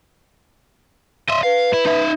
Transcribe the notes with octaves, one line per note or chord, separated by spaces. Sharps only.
D#5 E5 C6
B4 F5
E4
D#4 E5